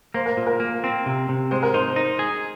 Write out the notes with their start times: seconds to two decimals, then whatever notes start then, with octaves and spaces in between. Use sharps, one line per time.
0.14 A#3 C5
0.26 A#4
0.37 A#2
0.46 A#4
0.60 A#3
0.84 C4
1.06 C3
1.29 C3
1.51 G#3 C5
1.63 A#4
1.74 D#4 C5
1.96 D#4
2.19 G#4